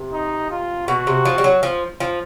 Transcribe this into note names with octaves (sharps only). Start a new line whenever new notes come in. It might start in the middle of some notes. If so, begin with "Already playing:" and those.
Already playing: C3
D#4
F4
B2 F#4
C3
F3
G3
F#3
F3
F3